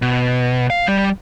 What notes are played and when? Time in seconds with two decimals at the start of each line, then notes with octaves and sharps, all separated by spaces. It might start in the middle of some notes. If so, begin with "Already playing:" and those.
0.02 B2
0.70 F5
0.87 G3